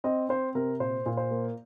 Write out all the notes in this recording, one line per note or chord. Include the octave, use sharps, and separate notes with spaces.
C4 D#5
C4 C5
C3 A#4
A#2 C5
A#2
C5
A#3